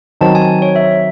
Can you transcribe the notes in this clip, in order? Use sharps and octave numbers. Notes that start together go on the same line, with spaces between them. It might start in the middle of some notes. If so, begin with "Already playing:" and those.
D#3 F#3 C4 D#4 A5
G#5
C#5
E5